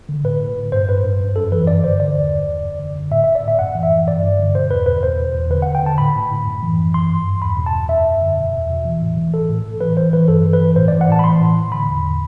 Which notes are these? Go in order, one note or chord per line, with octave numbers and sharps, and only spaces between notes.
D3
A2 B4
A2
A2
G2 C5
G2 B4
G2
F#2
F#2 A4
E3 B4
G2 D5
D3 C5
D3 D5
E2
D3
E2
F#2
D3
D3
A2 E5
A2 E5
D5
A2 E5
F#2 F#5
E3
E5
E3
G2 D5
G2
D3
B2 C5
E2 B4
B2 B4
E2 C5
B2
E2
D3 B4
F#5
D3
G5
D3 A5
A2 B5
A2
A2
F#2
E3
F#2
E3 C6
G2
G2
E2 B5
B2
A5
E2
F#2 E5
F#2
D3
B2
E2
B2
E3
A2
E3
E3 A4
A2
A2
E3 B4
E3 C5
E3 B4
G2 A4
E3
B4
E3
A2 C5
D5
E3
F#5
A2 A5
B5
E3 C6
A2
A2
D3 B5
E2
D3